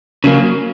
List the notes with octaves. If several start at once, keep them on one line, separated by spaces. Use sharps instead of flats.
C#3 F#3 A#3